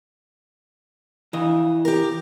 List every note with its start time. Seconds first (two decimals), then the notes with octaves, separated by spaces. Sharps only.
1.33 F2 E3 D#5
1.85 G4 A#4